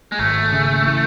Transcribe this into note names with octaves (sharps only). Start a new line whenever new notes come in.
G#3
G#1 A3
C#3
E3